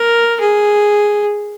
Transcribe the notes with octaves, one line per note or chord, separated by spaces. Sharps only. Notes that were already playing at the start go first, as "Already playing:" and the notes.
Already playing: A#4
G#4